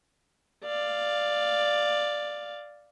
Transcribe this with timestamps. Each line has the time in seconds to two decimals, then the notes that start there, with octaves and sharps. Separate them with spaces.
0.65 D5 F5